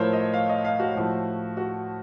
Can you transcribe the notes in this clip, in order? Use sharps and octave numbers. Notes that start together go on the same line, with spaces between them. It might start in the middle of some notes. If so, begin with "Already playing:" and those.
Already playing: A2 F3 A3 A#4 C5 C#5
D#5
F5
D#5
F5
F#4
A2 F3 A3
F#4